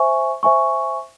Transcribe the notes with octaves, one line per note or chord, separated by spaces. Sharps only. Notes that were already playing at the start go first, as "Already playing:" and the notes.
Already playing: C5 E5 G#5 C#6
C5 E5 G#5 C#6